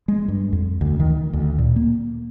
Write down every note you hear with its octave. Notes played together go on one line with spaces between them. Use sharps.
G#3
G2
F2
D2
D#3
D2
A#2
A#3